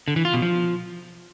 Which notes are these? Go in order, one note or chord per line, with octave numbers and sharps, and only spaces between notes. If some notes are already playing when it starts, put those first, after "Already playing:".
D3
E3
F4
B2
F3